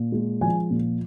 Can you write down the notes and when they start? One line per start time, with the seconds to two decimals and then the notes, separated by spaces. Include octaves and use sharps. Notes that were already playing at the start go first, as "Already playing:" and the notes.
Already playing: A#2
0.12 G#3
0.41 F3 G#5
0.70 A#2